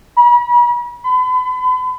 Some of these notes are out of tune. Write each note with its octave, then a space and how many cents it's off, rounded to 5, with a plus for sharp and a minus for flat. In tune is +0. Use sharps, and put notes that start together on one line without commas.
B5 -40
B5 +40